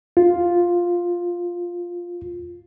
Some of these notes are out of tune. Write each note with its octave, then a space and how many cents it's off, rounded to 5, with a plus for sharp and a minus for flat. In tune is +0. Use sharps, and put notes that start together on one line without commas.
F4 +5